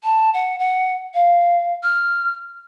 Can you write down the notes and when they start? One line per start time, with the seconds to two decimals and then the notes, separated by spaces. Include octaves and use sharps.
0.04 A5
0.34 F#5
0.59 F#5
1.14 F5
1.83 F6